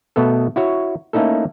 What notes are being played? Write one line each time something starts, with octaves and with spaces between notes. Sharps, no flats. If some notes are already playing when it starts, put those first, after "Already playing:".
B2 A3 B3 A4
E4 F#4 C#5
A3 A#3 C#4 D#4 E4 A4